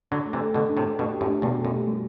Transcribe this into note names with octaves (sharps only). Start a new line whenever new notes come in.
D3 F#3 D4
A3
C3 E3
A4
B2 D3 A3
D4
A2 C3
A3
G2 B2 A3
G4
F#2 A2
D4
E2 G2 B2
A3
F#2
G4
G3